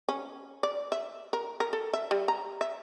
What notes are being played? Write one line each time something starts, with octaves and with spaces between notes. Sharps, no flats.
C#4
D5
E5
A#4
A#4
A4
E5
G3
A#5
E5